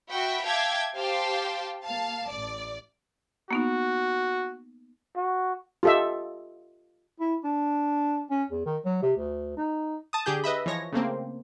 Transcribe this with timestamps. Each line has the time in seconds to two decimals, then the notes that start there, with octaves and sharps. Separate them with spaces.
0.11 F#4 E5 G5 B5
0.45 E5 F5 G5 A5 D6 G#6
0.95 G4 C5 F5 G5 A5
1.83 A#3 F5 A5
2.29 A1 D5
3.51 A#3 B3 D#4 F#4
5.16 F#4
5.83 F4 G4 A4 D#5 E5
7.20 E4
7.44 D4
8.30 C#4
8.50 E2
8.66 D#3
8.85 F#3
9.02 C3
9.17 D2
9.57 D#4
10.13 A5 D#6
10.26 D3 G4 G#4 G6
10.44 B4 D#5 E5 B5
10.66 E3 F3 C#5 A#6
10.92 C#3 A3 A#3 C4